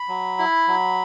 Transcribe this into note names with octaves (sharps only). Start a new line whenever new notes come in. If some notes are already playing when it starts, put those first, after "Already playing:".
Already playing: B5
F#3
E4
F#3